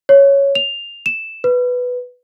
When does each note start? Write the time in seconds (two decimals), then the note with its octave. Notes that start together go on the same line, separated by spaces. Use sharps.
0.09 C#5
0.55 F7
1.06 E7
1.44 B4